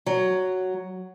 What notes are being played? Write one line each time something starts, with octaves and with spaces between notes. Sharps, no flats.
F#3